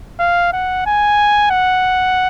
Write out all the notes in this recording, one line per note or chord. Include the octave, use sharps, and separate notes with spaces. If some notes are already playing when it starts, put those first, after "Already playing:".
F5
F#5
G#5
F#5